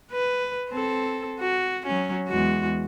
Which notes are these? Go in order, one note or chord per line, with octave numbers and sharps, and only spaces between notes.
B4
C4 A4
F#4
F#3 C#4
E2 G#3 F#4